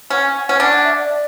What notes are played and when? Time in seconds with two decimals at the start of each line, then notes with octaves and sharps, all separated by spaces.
0.10 C#4 F#5
0.22 G#5
0.35 G#5
0.47 C#4 F#5
0.59 D4 F#5
0.71 F#5
0.84 E5
0.97 D5